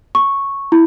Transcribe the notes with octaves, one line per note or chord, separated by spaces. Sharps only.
C#6
E4